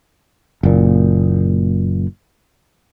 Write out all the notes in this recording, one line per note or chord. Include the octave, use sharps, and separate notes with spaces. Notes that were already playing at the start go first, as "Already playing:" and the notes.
F#1 A#2